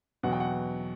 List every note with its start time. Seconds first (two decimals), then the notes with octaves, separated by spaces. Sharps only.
0.23 E2 B2 F#3 F#5
0.32 G5
0.40 F#5